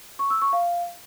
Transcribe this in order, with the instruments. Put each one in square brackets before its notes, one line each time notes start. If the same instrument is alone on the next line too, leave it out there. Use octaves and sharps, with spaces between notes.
[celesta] C#6
E6
C#6
F5